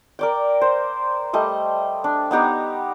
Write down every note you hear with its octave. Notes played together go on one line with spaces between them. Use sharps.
A#4 D5 G5
C5
G3 A3 D#5
D4
B3 D#4 G4 A#5